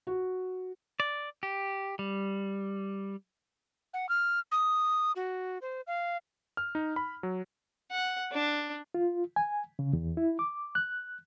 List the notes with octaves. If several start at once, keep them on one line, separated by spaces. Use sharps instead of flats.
F#4
D5
G4
G3
F#5
F6
D#6
F#4
C5
F5
F6
D#4
B5
F#3
F#5
D4
F4
G#5
C#3
E2
E4
D6
F#6